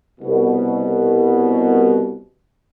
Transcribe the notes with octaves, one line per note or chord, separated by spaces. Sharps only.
C2 B2